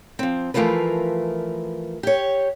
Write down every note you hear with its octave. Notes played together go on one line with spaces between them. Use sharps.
F3 C4
E3 F3 A3 F4 A#4 B4
G4 C#5